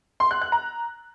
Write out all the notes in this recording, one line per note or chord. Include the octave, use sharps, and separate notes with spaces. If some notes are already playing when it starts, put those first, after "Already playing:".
C6
F#6
F#6
A#5